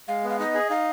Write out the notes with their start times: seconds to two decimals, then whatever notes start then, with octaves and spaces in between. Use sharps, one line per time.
0.08 G#3 F5
0.24 B3
0.30 F5
0.39 D#4 D#5
0.55 G#4
0.70 D#4 F5